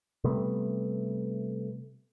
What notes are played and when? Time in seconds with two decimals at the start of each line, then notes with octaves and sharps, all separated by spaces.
0.24 C3 G3 A3 B3